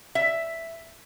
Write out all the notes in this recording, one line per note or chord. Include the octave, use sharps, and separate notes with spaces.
E5